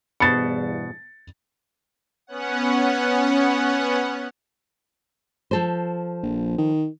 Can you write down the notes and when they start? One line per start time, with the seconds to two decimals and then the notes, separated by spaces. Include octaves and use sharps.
0.20 E2 G2 B2 B3 C5 A6 C#7
2.27 B3 C#4 F#5
5.51 F3 A4 C5
6.23 A#1
6.58 D#3